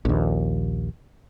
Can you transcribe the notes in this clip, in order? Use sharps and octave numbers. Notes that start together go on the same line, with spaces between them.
A#1 D#2